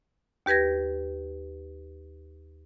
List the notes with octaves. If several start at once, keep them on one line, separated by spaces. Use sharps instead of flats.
D#2 G4 B4 G#6 A#6